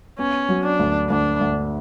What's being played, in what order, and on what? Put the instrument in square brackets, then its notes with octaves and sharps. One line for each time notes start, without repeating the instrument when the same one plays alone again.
[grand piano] B3 [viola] C#4
[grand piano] F#3
[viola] D4
[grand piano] D2
[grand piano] D2 [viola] D4
[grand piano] D2